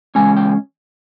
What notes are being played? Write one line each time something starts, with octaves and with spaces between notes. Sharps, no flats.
E2 C#3 G#3 C#4 G#5
G5